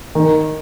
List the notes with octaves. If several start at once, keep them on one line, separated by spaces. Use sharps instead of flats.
D#3